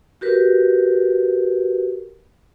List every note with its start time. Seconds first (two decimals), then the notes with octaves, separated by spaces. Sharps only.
0.21 F#4 G4 A#4 B4